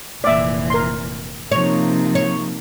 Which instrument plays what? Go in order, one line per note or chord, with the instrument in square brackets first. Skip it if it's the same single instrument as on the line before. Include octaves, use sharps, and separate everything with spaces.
[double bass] F1 [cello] A#2 E3 [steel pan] D5 E5
[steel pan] A#4 C6
[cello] C3 F3 [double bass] A#3 D#4 [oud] C#5
[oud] C#5